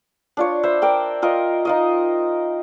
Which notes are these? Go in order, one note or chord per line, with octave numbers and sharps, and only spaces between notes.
D4 F4 C#5
C5 E5 B5
A#4 D5 G5
F4 A#4 D#5
D#4 F4 D#5